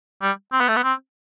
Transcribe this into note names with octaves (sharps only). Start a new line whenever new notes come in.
G3
C4
B3
A3
B3
C4